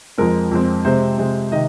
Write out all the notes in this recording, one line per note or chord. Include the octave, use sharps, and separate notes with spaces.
F2 F3 G#3 C4 A#4
F2 F3 G#3 C4
C3 G#3 C4 C5
C3 G#3 C4
C3 D#3 D#5